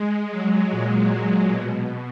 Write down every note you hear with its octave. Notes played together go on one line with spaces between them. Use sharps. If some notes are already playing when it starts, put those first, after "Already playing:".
Already playing: G#3
F#3
A#2
A#2
B2